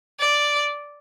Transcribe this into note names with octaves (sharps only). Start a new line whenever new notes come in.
D5